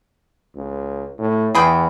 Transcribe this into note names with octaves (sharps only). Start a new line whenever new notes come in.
C#2
A2
E2 G#4 B4 G5